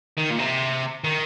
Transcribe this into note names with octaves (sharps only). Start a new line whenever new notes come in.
D#3
A#2
C3
D#3